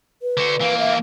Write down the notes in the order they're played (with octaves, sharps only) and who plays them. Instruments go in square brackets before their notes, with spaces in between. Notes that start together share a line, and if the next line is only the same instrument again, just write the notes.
[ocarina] B4
[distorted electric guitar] D3 F#4
[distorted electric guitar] E3 A#3 [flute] F5
[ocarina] E5